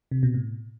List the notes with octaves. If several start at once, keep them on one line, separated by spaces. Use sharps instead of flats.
C3
B2
A2